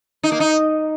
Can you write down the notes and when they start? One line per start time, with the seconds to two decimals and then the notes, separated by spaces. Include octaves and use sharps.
0.23 D#4
0.32 A#3
0.40 D#4